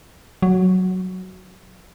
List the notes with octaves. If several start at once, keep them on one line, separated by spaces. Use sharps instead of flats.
F#3